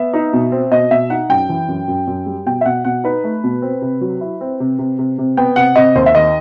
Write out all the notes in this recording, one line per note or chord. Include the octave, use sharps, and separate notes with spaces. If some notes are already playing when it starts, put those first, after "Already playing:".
Already playing: B3 E5
D#4
B2
C4
B2 D#5
B2 E5
D#4 F#5
F#2 G5
E3
F#2
F#2
F#2
G3
B2 G5
E5
B2 F#5
B2 F#5
D#4 B4
A3
B2
C4
C3
F#3
E4
C4
C3
C3
C3
C3
B3 G5
C3 F#5
C3 D#5
D#2 C5
E5
D#3 D#5